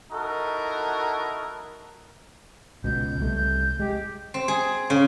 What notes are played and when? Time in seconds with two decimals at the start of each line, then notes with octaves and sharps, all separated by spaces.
0.13 D#4 E4 F#4 A4 A#4
2.84 C#2 B2 G6
3.21 C2 A3
3.80 G#3 G4
4.34 C4
4.48 G#4
4.90 C#3